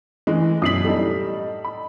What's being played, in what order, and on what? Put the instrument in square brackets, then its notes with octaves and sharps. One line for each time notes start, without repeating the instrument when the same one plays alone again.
[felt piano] E3 [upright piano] G#3 A3
[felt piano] F#2 B2 B6 [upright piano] D#6 C7 F#7
[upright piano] A2 G3 D#4 [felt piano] A4
[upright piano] B5